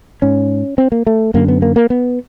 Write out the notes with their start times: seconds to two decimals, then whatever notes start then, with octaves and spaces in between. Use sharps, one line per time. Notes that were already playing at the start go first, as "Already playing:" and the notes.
0.22 G#2 C#4
0.78 C4
0.92 A#3
1.07 A3
1.34 F#2 D3 A#3
1.48 B3
1.62 A#3
1.76 A#3
1.90 B3